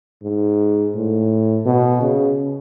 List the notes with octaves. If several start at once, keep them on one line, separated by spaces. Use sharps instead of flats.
G#2
A2
B2
C#3